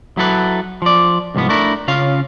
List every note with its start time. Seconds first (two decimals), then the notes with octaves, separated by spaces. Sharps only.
0.17 F#3 E4 A4 B4
0.82 F3 D5
1.35 C2 G#2 F3 B3
1.49 A3 D4 E4 A#4
1.88 C#3 C#4 F4 F5